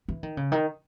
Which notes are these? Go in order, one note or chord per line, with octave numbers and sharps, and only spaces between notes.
E3
D#3
C#3
D#3